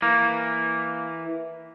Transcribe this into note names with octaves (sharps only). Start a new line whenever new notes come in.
E3 A#3